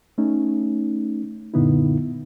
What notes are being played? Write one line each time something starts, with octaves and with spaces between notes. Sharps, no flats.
A3 C#4 D#4
F#2 A#2 D3 B3 D#4 E4